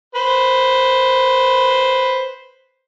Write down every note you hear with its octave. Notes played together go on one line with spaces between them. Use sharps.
B4 C5